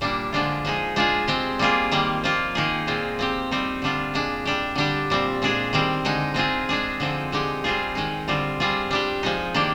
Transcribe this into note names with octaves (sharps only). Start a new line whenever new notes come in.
A#2 G3 A#3 D4
D3 F3 G#3 D4 F4
F3 G#3 D#4 G#4
G#3 D4 F4 G#4
G#3 C4 G4
G3 A#3 F4 G#4
D#3 G3 A#3
F3 A#3 F4
D#3 A#3 D#4 G#4
A#2 G#3 C4 F4
F3 C4 G4
G3 C4 D#4
D3 G3 D4 F4
A#2 G#3 D4
G3 D4 G4
D3 G3 D4 G4
A#2 G3 C4
A#2 G#3 D4 G#4
D#3 G3 C4
D3 G#3 D#4
G#3 C4 F4 G#4
G#3 D4 G#4
D3 F3 C4 D#4
D3 G#3 D#4 G4
G3 C4 F4 G#4
D#3 G#3 D#4
D3 G3 C4 F4
G3 C4 F4 G#4
G3 D4 G4
F3 G#3 D#4
D#3 A#3 D4 G4